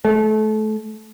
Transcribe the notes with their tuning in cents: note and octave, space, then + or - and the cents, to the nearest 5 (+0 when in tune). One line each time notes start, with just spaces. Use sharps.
A3 -30